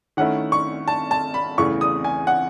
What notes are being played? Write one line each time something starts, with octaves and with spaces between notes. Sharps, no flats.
D#3 A3 C#4 E4 F#5
C#6
A5
A5
B5
E2 C#3 E3 A3 C#6
D#6
G#5
F#5